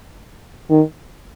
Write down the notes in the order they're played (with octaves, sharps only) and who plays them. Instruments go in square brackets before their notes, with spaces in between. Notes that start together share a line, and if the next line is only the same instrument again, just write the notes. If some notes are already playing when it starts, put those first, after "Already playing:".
[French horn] D#3